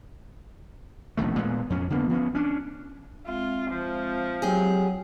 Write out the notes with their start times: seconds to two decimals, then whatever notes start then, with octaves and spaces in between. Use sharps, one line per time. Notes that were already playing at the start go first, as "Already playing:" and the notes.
1.17 E1 A#1 D#3 A3
1.38 A#2 G#3 B3
1.70 F2 C#4
1.90 D3 A#3 B3
2.10 F3 B3 C#4
2.35 C#4 D4
3.27 G#3 C4 F4 E5
3.71 F3
4.42 F#3 G4 G#4